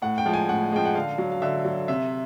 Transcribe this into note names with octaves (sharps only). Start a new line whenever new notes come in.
A2 F#5
G5
F3 G#3
G#5
A2 F#5
F3 G#3 G5
F#5
D3 F5
F#3
F5
D3 E5
F#3
C3 E5